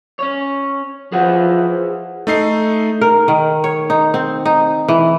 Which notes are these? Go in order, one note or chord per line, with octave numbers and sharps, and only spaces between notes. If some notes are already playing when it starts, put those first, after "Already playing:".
C#4 C#5
F3 G#4 B4 F#5
A3 D#4 C7
A#4
D#3
C#5
D#4
C4
D#4
E3